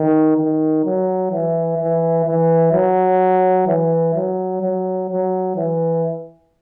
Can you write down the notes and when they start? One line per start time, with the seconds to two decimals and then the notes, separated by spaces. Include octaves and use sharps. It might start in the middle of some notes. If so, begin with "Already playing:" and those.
Already playing: D#3
0.37 D#3
0.84 F#3
1.32 E3
1.78 E3
2.25 E3
2.73 F#3
3.67 E3
4.14 F#3
4.62 F#3
5.10 F#3
5.56 E3